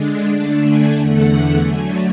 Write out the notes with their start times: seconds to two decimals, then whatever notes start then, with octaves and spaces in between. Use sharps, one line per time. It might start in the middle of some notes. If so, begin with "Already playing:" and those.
Already playing: D3 G#3 D4
0.29 D3 A3 D4 A5
0.62 G#5
0.95 E2 D3 A3 F#5
1.60 D3 F#3 A3 G#5